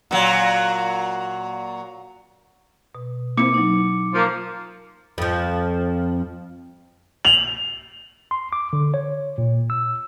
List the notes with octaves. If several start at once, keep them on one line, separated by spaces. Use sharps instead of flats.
A#2 F#3
B2
A#3 C4 E4 D6 C#7
F#3 D#4
F3 A#3
F2 F3
F7 F#7
C6
D6
D3
C#5
A#2
E6